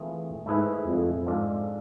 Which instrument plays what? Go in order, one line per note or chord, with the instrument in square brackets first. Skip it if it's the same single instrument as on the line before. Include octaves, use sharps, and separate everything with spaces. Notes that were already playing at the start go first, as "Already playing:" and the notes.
Already playing: [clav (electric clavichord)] E3 A3 C4 F4 G#4
[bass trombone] G#2 [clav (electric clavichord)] A3 E4 G#4 B4
[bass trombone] F2
[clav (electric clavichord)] G#2 G#3 D4 F4 A4